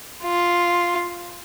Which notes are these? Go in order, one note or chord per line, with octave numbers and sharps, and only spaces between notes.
F4